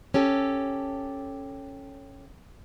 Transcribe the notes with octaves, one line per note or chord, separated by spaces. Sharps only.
C#4 G4 A4